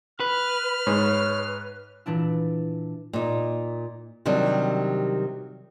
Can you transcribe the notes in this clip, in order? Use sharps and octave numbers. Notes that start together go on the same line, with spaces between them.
B4 F6
G#2 C#5
A#2 E3 D4 E4
A#2 D#4
C3 D#3 F#3 G3 D4